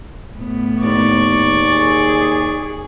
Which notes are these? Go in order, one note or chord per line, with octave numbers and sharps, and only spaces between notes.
A2 B3
D#2 D5 C#6
G#4